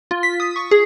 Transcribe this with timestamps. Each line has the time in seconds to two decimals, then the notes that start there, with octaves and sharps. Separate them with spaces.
0.11 F4
0.23 B6
0.40 D#6
0.56 C#6
0.71 G#4